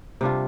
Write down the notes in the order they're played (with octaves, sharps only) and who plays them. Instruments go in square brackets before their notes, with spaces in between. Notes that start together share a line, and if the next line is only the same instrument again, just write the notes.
[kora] C3 G3 D4 F4